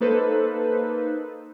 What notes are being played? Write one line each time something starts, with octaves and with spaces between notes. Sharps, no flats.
A#3 D#4 A4 B4 C5